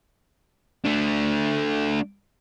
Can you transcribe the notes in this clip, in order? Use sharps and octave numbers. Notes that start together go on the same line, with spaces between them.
A3 D4